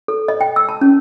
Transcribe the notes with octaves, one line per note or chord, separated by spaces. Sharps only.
A4
D#5
G5
E6
A5
C#4